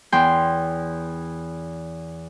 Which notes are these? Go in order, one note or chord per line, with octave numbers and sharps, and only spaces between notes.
E2 G5 C6